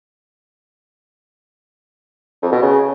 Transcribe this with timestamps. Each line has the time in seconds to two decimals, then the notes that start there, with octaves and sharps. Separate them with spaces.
2.43 F2
2.52 B2
2.62 C#3